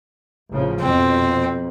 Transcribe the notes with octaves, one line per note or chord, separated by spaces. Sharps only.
A1 C#3 F3
F2 B2 C4